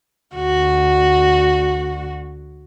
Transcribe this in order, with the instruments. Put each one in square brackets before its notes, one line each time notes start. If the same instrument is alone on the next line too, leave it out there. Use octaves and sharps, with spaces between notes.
[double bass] D2 [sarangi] F#4